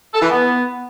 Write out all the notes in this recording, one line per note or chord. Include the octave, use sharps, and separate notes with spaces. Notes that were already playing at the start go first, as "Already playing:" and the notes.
A4
E3
B3